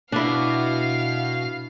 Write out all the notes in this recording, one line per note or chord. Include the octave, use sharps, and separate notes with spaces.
B2 D4 E4 F5